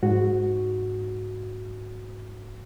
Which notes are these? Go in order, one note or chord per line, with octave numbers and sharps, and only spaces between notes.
G#2 F#4